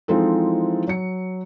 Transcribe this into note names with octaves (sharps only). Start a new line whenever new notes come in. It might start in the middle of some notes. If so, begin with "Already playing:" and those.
E3 F3 G#3 C4 D#4 A4
F#3 C#7